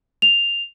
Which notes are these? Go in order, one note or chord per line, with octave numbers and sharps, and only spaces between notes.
F7